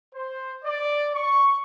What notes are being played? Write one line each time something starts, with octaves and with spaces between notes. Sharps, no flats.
C5
D5
C#6